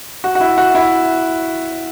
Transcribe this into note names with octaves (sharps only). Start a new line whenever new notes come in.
F#4
F#4
E4
F#4
E4